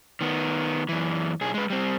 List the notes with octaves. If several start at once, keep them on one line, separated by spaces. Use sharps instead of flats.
D#3 B3
F#2 E3
B1 G#4
G#3 B4
G3 C4